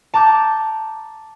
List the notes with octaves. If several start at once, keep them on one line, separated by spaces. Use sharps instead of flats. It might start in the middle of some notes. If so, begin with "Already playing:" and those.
A5 A#5 D6 G6